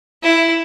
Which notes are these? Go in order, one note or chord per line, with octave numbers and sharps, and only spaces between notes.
E4